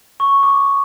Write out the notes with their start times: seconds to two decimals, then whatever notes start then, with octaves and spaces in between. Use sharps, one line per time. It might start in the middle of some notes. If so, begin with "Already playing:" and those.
0.20 C#6
0.43 D6